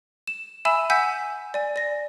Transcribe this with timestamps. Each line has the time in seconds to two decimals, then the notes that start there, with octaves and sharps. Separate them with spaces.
0.28 E7
0.65 E5 G#5 B5 E6 E7
0.90 F#5 G#5 E6 G6 B6
1.54 D5 G#5
1.76 D5 A#6